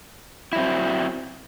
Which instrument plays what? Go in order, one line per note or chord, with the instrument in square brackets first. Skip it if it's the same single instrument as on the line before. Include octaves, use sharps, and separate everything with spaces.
[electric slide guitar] E4
F#3
C4